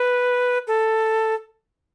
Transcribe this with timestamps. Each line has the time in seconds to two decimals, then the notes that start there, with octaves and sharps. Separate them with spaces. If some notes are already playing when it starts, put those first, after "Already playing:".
Already playing: B4
0.67 A4